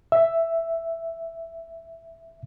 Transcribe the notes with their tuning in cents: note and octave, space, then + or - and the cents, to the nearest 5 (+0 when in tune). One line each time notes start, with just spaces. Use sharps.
E5 +5